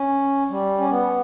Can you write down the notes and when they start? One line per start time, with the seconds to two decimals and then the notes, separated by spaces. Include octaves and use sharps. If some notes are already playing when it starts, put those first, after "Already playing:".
Already playing: C#4
0.49 G3
0.78 C#4
0.90 B3